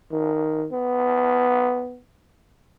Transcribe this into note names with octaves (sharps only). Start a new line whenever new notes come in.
D#3
B3